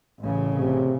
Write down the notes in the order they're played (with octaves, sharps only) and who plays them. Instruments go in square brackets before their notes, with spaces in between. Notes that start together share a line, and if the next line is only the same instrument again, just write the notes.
[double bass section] A1 C#3
[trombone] C3